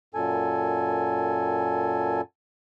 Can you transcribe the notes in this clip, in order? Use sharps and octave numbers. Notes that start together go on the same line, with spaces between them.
F#2 A#2 A4 G#5